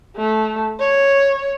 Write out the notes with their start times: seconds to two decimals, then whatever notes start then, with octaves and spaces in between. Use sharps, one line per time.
0.16 A3
0.80 C#5